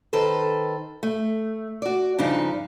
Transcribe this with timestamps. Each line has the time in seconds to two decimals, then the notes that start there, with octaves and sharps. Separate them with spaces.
0.13 D#3 A4 B4 C5
1.03 A3
1.82 F#4 D5
2.18 G2 C#3 F3 D4 D#4